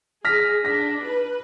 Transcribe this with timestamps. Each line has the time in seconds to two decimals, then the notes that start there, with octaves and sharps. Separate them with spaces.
0.25 G#4 F6 A#6 B6
0.65 D4 A#6 B6
1.03 B4